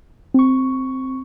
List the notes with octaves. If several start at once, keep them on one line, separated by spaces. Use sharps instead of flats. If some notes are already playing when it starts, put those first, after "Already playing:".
C4 C#6